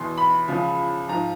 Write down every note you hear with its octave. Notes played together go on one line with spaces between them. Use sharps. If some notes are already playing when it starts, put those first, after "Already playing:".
Already playing: E2 B2 C6
B5
C#2 C#3 F3
G#2 F3 A#5